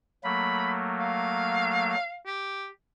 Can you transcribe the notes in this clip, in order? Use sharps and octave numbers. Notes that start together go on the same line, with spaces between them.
F#3 A3 A#3 B5
F5
G4